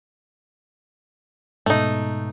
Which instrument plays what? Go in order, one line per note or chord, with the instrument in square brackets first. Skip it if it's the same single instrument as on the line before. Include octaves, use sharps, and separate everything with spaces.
[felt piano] G#2 B2 [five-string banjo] A3 D#4